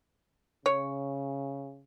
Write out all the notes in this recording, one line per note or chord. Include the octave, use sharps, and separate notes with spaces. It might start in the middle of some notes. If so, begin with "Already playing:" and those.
C#3 C#5